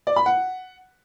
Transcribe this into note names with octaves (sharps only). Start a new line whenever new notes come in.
D5
B5
F#5